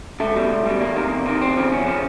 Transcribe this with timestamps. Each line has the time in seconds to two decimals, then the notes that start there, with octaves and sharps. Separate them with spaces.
0.20 C#2 A3
0.35 B2 G3
0.50 C#2
0.66 B2 G3
0.80 E2 A#3
0.96 C3 D#3
1.11 E2
1.26 C3 D#3
1.41 E2 C4
1.57 C#3 F3
1.72 E2 C#4
1.87 C#3 F3